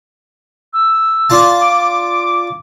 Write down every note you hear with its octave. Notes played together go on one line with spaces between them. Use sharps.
E6
D4 F4 A5
D6